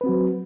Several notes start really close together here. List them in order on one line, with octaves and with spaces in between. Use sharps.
B4 C4 F#4 F#3